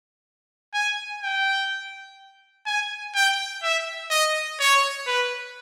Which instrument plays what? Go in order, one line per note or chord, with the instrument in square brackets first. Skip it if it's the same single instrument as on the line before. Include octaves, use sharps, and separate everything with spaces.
[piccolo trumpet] G#5
G5
G#5
G5
E5
D#5
C#5
B4